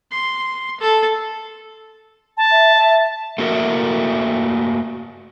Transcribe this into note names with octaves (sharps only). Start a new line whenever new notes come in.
C6
A4
A5
E5
E5
A3 A#3 F#4 A#4 E5